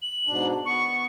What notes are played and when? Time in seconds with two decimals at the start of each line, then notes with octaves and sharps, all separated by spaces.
0.02 F#7
0.27 G#2 B2 D4
0.65 B3 C#6